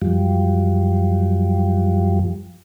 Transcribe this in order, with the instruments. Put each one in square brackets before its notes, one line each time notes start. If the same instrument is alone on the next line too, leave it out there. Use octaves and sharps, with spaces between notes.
[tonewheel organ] F#2 F3 G3